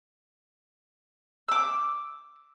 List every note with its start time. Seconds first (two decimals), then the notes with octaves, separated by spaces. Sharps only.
1.49 D6 E6